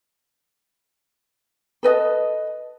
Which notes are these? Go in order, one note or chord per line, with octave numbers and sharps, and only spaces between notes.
A4 B4 D#5